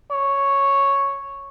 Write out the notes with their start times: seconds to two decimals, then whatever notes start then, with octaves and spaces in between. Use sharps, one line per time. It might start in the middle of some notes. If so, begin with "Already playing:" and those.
0.11 C#5